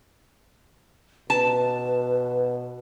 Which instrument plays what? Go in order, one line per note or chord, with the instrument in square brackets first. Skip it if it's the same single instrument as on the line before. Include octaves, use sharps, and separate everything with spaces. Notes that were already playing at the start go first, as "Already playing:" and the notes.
[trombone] B2 [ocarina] B4 [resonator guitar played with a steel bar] A5